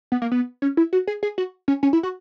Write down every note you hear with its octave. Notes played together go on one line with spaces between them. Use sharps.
B3
A#3
B3
C#4
E4
F#4
G#4
G#4
F#4
C#4
C#4
E4
F#4